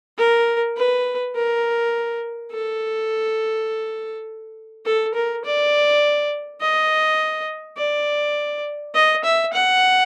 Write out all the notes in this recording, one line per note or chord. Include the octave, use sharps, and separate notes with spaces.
A#4
B4
A#4
A4
A4
A#4
D5
D#5
D5
D#5
E5
F#5